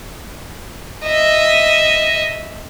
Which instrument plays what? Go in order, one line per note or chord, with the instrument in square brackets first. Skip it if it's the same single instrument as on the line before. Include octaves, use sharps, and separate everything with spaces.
[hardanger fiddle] D#5 E5